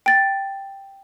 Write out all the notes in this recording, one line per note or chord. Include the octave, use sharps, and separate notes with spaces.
G5 A6